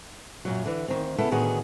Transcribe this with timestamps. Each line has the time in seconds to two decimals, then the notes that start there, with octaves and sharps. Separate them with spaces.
0.45 F#2 A#2 F#3
0.66 D3 E3
0.88 D2 D#3 C4
1.18 C#3 B3 E4 A4
1.31 A2 D3 D#3 B3 F#4 G#4